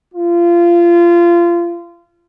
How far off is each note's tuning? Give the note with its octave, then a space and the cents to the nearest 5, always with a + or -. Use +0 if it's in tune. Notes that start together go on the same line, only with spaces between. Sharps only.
F4 -25